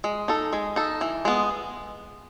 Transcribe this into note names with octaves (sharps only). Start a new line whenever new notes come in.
G#3
D#4 A4
G#3
D#4 A4
E3
G#3 B3